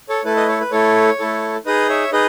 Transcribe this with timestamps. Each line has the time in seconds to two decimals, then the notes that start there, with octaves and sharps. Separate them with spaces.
0.09 A4 C#5
0.24 A3 E4 A4 B4
0.36 B4 D#5
0.48 A4 C#5
0.61 B4
0.71 A3 E4 A4 C#5
1.19 A3 E4 A4
1.66 D#4 G#4 B4 D#5
1.89 C#5 E5
2.12 D#4 G#4 B4 D#5